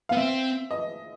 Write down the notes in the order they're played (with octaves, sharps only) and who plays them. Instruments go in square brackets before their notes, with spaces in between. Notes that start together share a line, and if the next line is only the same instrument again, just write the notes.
[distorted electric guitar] B3 [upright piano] F5
[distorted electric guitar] C4 [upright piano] E5
[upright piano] D#5